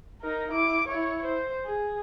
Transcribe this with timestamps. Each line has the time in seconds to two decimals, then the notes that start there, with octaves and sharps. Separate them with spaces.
0.21 D#4 A#4
0.51 E4 D6
0.87 E4 C#5
1.25 C5
1.66 G#4